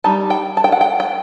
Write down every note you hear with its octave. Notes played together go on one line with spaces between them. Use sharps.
G3 D#4 A5
G5
A5
G5
F#5
G5
G5